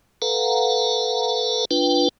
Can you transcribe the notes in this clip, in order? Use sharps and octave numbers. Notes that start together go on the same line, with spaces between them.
A4 B4 F5 F#5 A#5
D4 F4 B4 G5